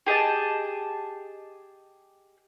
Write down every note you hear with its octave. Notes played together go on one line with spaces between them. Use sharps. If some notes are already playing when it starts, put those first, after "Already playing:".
G4 G#4 D#5 A5